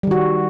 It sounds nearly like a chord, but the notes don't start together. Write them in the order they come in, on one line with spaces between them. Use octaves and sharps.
G3 D#3 F#4